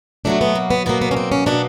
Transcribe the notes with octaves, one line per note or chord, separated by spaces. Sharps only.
B2 F#3 A3 D4
B3
A#3
B3
B2 F#3 A#3 B3
B3
C#4
C4
C#4
B2 F#3 A#3 D4